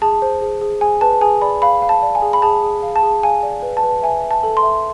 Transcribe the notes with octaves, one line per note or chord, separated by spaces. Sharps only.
G#4 A5
C5
G#4
G#4
G#4 G#5
B4 A5
G#4 G#5
D5 B5
F5 B5
F5
A5
D5
G#5
G#4
B5
G#4 A5
G#4
F5
A5
G#4
F5 G#5
D5
B4
A5
B4
E5 G#5
E5
A5
A4
C6
E5